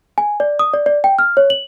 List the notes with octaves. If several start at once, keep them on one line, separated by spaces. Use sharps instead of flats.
G#5
D5
D#6
D5
D5
G5
F6
C#5
F#7